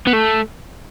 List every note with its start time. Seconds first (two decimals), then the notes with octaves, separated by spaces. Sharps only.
0.07 B3
0.13 A3